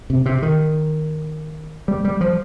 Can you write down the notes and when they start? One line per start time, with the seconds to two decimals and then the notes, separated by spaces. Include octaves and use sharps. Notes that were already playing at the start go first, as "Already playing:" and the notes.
0.10 C3
0.26 C3
0.42 D#3
1.88 G3
2.05 G3
2.21 F3